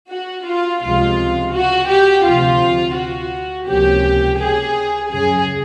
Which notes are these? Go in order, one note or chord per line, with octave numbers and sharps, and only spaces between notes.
F#4
F4
C#2 C3 F3 G#3 F4
F#4
G4
D2 C3 F3 F4
F#4
C#2 C3 F3 A#3 C#4 G4
G#4
F#2 C#3 F#3 G#4